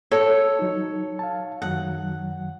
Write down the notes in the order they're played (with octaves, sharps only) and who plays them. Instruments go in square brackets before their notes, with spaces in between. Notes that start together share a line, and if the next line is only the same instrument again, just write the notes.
[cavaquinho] A4 [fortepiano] C#5
[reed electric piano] F#3 D#4
F5 A5
[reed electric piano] F#2 D#3 F#3 [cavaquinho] F#5